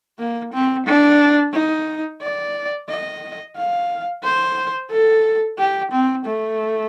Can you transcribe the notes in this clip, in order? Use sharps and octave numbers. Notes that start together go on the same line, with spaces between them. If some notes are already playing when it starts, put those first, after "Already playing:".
A#3
C4
D4
D#4
D5
D#5
F5
C5
A4
G4
C4
A3